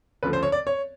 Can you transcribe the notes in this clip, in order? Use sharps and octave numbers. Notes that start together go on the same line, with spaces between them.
D2 C#3 F3 A3 B4
C5
C#5
D5
C#5